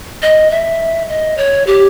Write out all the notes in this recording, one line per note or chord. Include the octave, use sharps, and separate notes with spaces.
D#5
E5
D#5
C#5
G4